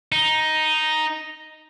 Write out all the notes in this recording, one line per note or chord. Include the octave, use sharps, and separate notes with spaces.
D#4